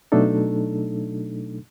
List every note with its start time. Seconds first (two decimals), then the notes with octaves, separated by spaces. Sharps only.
0.12 B2 F#3 A3 D4 D#4 A4